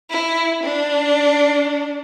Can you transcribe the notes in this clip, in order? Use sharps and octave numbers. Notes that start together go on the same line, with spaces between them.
E4
D4